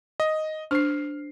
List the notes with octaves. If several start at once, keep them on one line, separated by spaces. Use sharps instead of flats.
D#5
D4 C5 C#6 F6 C7